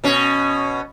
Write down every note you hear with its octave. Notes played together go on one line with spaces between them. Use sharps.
B2 C#4